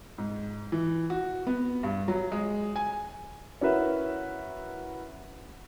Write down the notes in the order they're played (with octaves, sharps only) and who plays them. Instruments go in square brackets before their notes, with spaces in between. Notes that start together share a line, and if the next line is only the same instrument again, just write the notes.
[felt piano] G#2
E3
F#4
B3
G2
F#3
G#3
G#5
[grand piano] C#4 E4 F#4 A#4 B4 E5